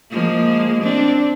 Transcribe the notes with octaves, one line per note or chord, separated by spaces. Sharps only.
F3 G#3 A#3
C4 D4